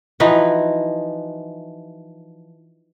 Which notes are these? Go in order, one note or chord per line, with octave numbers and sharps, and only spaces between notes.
E3 F3 D#4 F#4